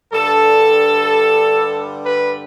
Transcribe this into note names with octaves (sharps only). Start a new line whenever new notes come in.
G2 D3 G3 A4
B4